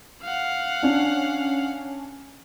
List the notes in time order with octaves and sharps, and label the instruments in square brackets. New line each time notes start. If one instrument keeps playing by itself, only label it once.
[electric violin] F5 F#5
[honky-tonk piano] C#4 D4